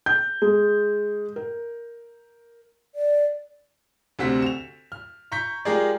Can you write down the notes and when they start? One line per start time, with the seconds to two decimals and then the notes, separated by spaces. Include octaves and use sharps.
0.06 G6
0.42 G#3
1.36 A#4
2.95 D5
4.19 D2 C3 C4 F#4 B6
4.42 E7 F7
4.92 F6
5.32 A#5 C#6 G6 B6
5.65 G#3 F4 G4 G#4 A#4 D5